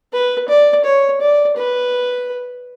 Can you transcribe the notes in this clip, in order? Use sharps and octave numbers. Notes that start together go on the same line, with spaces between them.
B4
D5
C#5
D5
B4